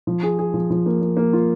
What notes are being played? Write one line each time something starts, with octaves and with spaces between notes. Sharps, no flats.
F3
G#4
G#4
F3
F3
A#3
A#3
A#3
F4